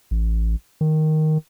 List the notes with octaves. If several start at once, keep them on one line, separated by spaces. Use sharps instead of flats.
A1
D#3